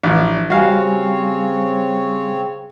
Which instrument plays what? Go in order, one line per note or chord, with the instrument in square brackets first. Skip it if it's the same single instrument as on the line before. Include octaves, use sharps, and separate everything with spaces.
[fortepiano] A1 [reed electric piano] F3 D4
[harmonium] C#3 C4 C#5 [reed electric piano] G3 G4 G#5 [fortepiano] F#4 F5